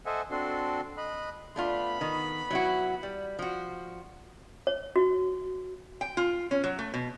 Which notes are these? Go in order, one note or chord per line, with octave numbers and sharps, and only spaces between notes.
A4 C5 D#5 E5 F#5 G#5
C4 D4 F#4 A4 C6
D#5 B5 F#6
A3 B3 D4 F4 B5
D#3
F#3 E4 F#4
G3
F3 F#4
C#5
F#4
G5
F4
C#4
F#3
A3
B2